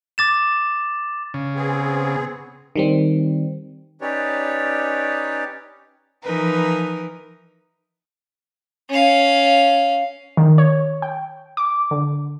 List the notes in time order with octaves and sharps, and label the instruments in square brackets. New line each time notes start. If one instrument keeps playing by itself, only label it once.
[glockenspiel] D6 A6 E7
[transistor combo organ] C#3
[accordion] B3 C4 G#4
[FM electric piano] D#3 G3 C4
[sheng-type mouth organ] C#4 D#4 G4 B4 C#5 D5
[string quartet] E3 F3 D#4 A#4 B4
[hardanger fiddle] C#4 F5
[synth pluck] D#3
C#5
G5
D6
D3